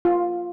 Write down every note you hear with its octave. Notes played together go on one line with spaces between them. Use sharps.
F4